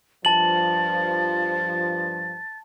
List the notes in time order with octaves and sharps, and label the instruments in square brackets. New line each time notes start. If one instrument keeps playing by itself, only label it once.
[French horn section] G2 F3 [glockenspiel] A5 F#7 [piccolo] A6